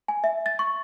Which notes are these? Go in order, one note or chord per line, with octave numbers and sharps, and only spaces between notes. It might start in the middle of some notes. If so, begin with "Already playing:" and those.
G#5
E5
A6
C#6